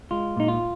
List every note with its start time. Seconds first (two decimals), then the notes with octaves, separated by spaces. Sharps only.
0.11 G#3 F4
0.37 A#2 D#4
0.48 F4